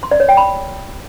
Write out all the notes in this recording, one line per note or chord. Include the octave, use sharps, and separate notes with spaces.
C6
D5
C#5
G5
B5